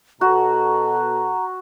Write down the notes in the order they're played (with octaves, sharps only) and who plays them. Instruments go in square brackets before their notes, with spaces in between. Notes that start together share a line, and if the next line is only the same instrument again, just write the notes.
[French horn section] B2 A4 [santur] F#4 [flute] A#5